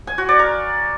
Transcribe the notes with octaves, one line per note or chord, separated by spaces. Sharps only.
G#5
F#4
D5
A#4